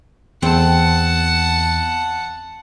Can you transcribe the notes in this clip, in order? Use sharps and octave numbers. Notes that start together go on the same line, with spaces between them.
E2 C4 F#5 A5